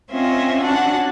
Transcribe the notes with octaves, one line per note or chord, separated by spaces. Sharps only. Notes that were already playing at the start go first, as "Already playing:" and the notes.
C4 C#4 F4 D#5 E5
C#4 D4 F#4 F#5 A5